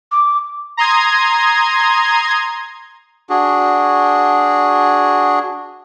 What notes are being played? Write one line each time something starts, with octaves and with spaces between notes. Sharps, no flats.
D6
A#5 C6 D#6 G#6
D4 F#4 G#4